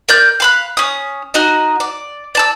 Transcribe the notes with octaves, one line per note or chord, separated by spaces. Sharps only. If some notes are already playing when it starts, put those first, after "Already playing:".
A#4 D5 G6
F5 B5 F#6
C#4 D#6
D#4 F#4 D#5
D5
D5 A5 E6